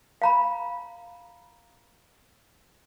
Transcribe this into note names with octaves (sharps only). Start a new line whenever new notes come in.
F5 A#5 B5